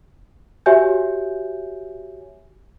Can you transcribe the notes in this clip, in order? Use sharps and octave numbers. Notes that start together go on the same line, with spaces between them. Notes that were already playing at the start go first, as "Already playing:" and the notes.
F#4 G4 C#5 E5 G#5 G6